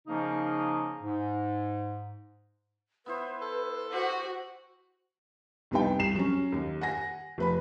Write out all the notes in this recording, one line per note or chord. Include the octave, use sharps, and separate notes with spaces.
C#3 F3 A#3 C#4 D#4
G#2
B3 E4 B4 C5
A4
F#4 G4 C5
C2 C3 B3 D#4 G5
C2 C7 E7
F#3 C#4
D#2
F#5 G#5 A#6
F1 B4 B5